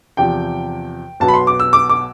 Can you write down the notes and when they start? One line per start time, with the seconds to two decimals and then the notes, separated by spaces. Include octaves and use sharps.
0.17 E2 C3 F3 G5
1.20 B1 B2 B3 A5
1.28 B5
1.34 C6
1.47 D6
1.60 E6
1.73 D6
1.89 D6